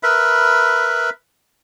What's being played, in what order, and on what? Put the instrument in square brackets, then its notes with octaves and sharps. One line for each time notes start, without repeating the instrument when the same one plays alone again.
[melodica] A#4 B4 E5 B5